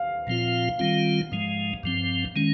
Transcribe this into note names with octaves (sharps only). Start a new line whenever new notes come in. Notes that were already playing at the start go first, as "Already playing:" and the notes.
Already playing: F5
A#2 F3 C4 F4
D#3 G3 C4 F4
G#2 F3 G#3
G2 F3 C4
D#3 G#3 C#4